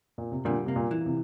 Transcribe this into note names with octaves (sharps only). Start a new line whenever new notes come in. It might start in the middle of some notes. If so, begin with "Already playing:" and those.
A#2
C3
A#2 D3 G3
C3 A#3
A#2
E3
C3